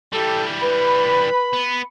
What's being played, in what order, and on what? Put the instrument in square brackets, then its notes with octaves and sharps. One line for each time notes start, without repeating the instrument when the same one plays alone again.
[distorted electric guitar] E3 G3 [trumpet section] G4 A4
[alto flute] B4 [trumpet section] B5
[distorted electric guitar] B3